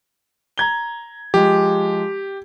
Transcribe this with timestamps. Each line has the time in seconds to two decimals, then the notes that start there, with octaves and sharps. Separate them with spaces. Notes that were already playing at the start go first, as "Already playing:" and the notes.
0.58 A#5 G#6 G7
1.34 F3 G#3 G4